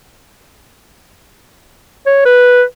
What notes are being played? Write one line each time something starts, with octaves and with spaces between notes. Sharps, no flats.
C#5
B4